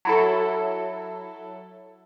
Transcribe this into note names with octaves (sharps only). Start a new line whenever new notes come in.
F#3 E4 A4